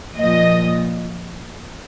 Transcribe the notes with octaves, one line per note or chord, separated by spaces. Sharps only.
A#2 F3 D#5